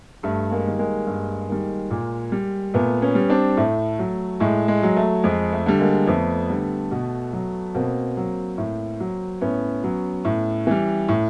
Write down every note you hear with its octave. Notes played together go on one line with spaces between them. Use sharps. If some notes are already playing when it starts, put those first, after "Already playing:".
G2 A3
G#3 A#3
D#3 G3
G#3 A#3
G2
D#3 G3
A#2
G3
A#2 A3 B3
B3 C#4
G3
C4 D4
A2 A3
F#3
A2 G#3
G#3
F#3
A3
F2 G#3
A3
D3 G3
G#3 A#3
F2 A3 B3
D3 G3
B2
F#3
B2 A#3 C4
F#3
A2
F#3
A2 B3 C#4
F#3
A2
E3 G3
A2